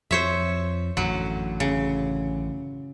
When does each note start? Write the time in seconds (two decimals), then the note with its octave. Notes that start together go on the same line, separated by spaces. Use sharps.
0.11 F2 F3 C5 C#5 E5
0.97 A1 F#2 D3 F#3
1.60 C#3